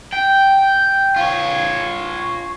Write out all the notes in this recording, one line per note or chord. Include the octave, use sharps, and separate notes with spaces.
G5
F4 C#5